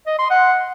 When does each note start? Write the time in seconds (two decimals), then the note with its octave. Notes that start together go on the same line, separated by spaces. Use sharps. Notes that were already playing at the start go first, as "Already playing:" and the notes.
0.07 D#5
0.19 C6
0.30 F#5